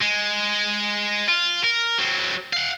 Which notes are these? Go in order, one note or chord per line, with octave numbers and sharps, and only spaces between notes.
G#3
F4
A#4
F#3 C4
F5 F#5